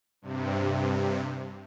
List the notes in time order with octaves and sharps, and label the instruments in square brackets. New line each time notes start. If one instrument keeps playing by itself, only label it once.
[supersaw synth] G2 C3